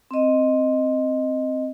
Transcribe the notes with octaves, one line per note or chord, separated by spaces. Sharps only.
C4 D#5